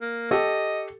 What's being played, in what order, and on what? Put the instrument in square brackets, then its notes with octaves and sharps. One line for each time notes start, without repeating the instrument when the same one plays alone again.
[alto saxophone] A#3
[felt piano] G4 A4 E6 [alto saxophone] D#5